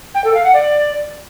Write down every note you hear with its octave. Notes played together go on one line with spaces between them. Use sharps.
G5
A4
F5
F#5
D5